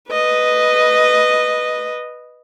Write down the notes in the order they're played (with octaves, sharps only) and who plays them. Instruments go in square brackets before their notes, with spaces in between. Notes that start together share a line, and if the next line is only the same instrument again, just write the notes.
[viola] B4 D#5